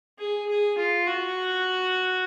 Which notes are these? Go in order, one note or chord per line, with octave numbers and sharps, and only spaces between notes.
G#4
G#4
F4
F#4